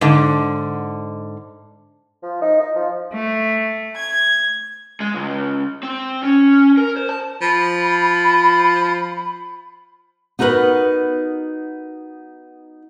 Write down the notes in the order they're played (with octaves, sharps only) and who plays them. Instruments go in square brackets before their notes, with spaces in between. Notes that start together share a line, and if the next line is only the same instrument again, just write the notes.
[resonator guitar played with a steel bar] G#2 D3
[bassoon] F3
D#4
D#4
F3
[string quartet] A3
G#6
[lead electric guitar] G#3
C#2
C4
C#4
A#4
C5
A5
[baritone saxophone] F3 [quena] B5
[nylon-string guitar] B3 D#4 F#4 A#4 B4